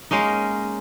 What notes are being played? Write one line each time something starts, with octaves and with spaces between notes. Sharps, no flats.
G#3 A#3 C#4 D#4